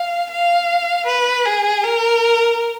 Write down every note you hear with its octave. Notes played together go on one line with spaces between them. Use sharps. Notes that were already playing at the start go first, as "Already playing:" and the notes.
Already playing: F5
F5
B4
G#4
A#4